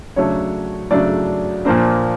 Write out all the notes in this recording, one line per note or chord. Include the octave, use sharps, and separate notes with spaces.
C#3 F#3 A3 D4 C#5
C#3 F#3 A3 D4 D5
A#2 F3 A#3 D4 C5